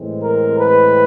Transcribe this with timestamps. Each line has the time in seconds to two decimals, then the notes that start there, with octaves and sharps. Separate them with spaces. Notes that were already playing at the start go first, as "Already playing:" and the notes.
Already playing: A2 E3 G#3 C4
0.23 A#4
0.60 B4